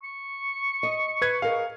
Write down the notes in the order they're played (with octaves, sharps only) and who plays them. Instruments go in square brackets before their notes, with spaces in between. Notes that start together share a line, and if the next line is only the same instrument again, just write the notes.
[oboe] C#6
[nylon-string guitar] D#5
[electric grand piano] B4 G#6
[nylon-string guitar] G#4 A#4 D#5 [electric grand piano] F5